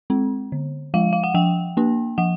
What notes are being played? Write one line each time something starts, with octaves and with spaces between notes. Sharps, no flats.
G#3 C4
D3
F3 G#3 F5
F5
F#5
F3 G5
A#3 D4
F3 F#5